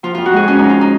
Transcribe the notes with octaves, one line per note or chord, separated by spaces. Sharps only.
F3 F4
F2 F4
F#4
G#3 G#4
F2 C#4
F3 D#4
F4
D#4